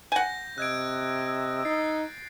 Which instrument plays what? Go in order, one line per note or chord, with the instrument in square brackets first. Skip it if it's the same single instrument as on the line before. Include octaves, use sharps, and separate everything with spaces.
[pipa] F#5 G#5 [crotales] G6 A#6
[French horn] C3 [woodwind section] D#5 D#6 E6 [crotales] F#6 G#6 D7
[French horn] D#4 [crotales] A6 C7